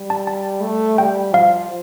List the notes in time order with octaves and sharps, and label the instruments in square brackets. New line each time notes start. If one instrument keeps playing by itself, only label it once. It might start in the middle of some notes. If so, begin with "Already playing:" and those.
Already playing: [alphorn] G3
[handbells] A5
A5
[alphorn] A3
[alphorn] G3 [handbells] G5
[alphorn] F3 [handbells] F5